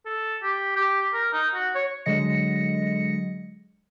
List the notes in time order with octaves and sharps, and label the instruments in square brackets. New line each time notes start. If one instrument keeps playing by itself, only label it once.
[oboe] A4
G4
G4
A#4
D#4
F#4
C#5
[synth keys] D3 F#3 G#3 D#5 A#6 C#7